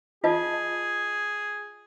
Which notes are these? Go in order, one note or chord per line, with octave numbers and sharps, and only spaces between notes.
F4 G#4 D#5 A5